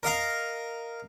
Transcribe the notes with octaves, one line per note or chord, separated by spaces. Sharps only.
A#4 D#5 F5 A#5